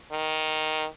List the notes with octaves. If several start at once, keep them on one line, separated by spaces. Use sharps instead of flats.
D#3